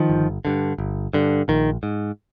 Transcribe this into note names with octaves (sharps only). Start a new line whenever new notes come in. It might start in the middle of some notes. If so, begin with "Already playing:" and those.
Already playing: D#3 F3
G1
G2 D3
G1
G2 D3
A#1 D#3
G#2